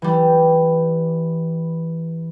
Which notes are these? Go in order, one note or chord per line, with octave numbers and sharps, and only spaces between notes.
E3 G3